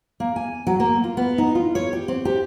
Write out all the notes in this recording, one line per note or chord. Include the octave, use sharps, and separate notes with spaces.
A#3
G#5
F#3
A#3
F4
B3
D#4
F4
C#5
G4
C4
G4